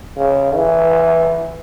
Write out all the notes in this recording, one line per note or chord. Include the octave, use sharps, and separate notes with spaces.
C#3
E3